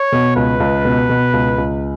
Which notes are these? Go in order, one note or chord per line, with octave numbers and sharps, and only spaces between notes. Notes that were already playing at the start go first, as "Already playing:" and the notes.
Already playing: C#5
B2
C#2 B4
C#2
B2
B2
C#2
C#2